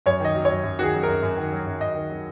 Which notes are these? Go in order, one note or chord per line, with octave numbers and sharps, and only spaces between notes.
F#2 C#5
D#3 D#5
F#3
C#5
F#2
F#2
D#3 F#4 G#4
F#3
F#2 A#4
F#2
D#3
F#3
F#2
F#2 D#5
D#3
F#3